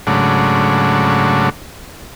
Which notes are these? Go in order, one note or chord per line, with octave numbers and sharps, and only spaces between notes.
G#2 C#3 F#3 A3 D4